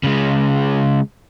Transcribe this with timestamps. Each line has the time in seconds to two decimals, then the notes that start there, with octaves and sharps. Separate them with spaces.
0.03 C#3 G#3